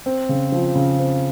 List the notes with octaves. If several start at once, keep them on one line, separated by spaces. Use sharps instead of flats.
C4
C#3
F3
C#3
C4